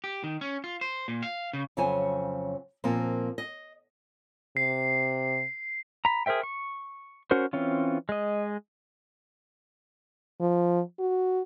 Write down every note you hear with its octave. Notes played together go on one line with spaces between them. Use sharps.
G4
D#3
C#4
F4
C5
A#2
F5
C#3
F2 C#3 F#3 C5 C#5 G#5
A#2 F3 A#3 C4
D#5
C3 C7
A#5 B5
G#4 A#4 C5 E5 G5
C#6
C#4 F#4 A#4 C5
E3 C4 C#4 F4
G#3 D#5
F3
F#4